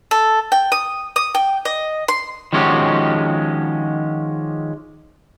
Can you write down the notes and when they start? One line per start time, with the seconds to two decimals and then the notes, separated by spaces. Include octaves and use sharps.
0.11 A4
0.52 G5
0.72 D#6
1.16 D#6
1.35 G5
1.65 D#5
2.08 C6
2.53 D#3 F3 G#3 C#4 F#4 G4